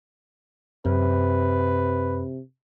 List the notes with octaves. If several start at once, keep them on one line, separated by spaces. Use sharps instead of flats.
F#2 C3 B4